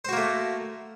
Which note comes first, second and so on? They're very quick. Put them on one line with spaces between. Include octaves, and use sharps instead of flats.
C5 F#4 A#3 A3